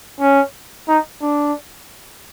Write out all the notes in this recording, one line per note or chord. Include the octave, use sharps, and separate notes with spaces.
C#4
D#4
D4